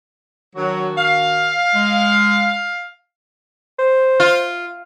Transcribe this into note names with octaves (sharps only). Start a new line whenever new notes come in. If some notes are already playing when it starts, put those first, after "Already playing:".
D#3 F#3 D4 F#4
F5
G#3
C5
F4